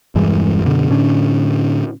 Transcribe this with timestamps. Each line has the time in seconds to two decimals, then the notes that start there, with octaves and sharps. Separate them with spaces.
0.15 E1 G2 E3 G#3
0.63 F#2 B2 D3
0.90 A2 D3 C#4 D4